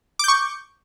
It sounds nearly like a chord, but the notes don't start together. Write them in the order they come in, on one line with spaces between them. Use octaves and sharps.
D6 G6 C#6